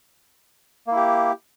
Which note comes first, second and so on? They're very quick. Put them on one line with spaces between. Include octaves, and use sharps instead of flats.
A#3 E4 G4